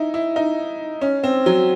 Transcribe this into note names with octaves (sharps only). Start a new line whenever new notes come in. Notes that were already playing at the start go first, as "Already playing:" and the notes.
Already playing: D#4 E4
E4
D#4
C#4
C4
F#3